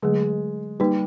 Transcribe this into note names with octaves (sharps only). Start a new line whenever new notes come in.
D3 F#3 G#3 A3
G3 A#3 D#4 G4 B4